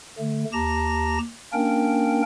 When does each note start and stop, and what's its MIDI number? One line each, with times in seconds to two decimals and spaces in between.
0.19 0.44 50
0.19 0.44 57
0.53 1.18 39
0.53 1.18 67
0.53 1.18 81
0.53 1.18 82
0.53 1.18 94
1.53 2.22 58
1.53 2.22 61
1.53 2.22 62
1.53 2.22 70
1.53 2.22 79